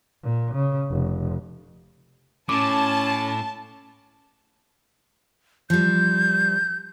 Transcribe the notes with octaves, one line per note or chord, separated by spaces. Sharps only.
A#2
C#3
F1
A2 C#4 A5 D6
F3 G3 G6